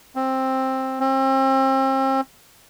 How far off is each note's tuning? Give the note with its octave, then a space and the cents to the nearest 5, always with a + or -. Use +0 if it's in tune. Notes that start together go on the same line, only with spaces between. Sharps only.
C4 +10
C4 +35